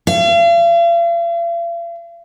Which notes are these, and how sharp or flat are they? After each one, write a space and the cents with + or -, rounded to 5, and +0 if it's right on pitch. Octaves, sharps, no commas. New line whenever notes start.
F5 -45